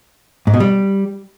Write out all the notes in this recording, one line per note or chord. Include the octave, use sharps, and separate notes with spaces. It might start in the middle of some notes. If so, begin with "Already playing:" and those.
G#2
B2
G3